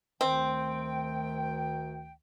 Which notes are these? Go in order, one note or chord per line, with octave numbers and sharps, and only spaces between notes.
D2 D#3 C4 G5